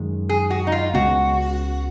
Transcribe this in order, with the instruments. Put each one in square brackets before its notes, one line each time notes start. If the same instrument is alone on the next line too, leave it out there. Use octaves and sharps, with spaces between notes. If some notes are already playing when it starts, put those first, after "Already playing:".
Already playing: [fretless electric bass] F#2 D#3 G#3
[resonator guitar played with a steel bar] G#4
F#4
D#4
F4
[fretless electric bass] C#2 C#3 G#3 B3 [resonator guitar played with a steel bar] F#4